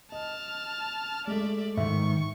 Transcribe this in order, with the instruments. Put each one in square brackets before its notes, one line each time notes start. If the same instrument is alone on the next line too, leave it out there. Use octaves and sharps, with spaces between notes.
[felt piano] D#5 [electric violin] A5 F6
[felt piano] G#3 A3 [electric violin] D5 E5
[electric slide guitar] G#2 D#3 [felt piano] E5 [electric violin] C#6